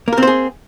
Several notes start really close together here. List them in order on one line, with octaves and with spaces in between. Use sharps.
A#3 A#4 C4 C5 G#4